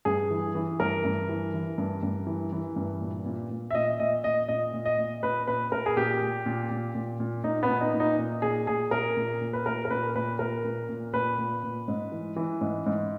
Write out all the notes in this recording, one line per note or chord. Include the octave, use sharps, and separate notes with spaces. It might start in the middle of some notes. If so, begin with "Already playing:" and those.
G2 G#4
E3
E3
G2 A#4
G2
E3
E3
G2
G2
E3
E3
G2
A#2
A#2
A#2
E5
A#2 D#5
A#2 D#5
A#2 D#5
A#2 D#5
A#2
D#5
A#2
A#2 B4
A#2 B4
A#2 A#4
G#4
A#2 G4
A#2
A#2
A#2
A#2
A#2
A#2 D#4
B3
A#2
D#4
A#2
D#4
A#2
A#2 G#4
A#2 G#4
A#2 A#4
A#2
A#2
B4
A#2 A#4
A#4
A#2 B4
A#2 B4
A#2 A#4
A#2
A#2
A#2 B4
A#2
A#2
G#2
E3
E3
G#2
G#2